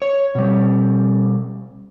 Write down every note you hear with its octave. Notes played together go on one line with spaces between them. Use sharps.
C#5
B2 G3